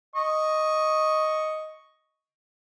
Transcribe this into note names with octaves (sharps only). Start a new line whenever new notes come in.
D#5 C#6